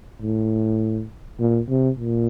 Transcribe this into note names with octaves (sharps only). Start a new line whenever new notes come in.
A2
A#2
C3
A#2